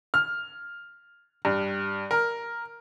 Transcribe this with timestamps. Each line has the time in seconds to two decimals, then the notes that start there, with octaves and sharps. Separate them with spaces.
0.14 F6
1.45 G2
2.11 A#4